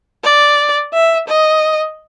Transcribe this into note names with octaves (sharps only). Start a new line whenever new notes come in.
D5
E5
D#5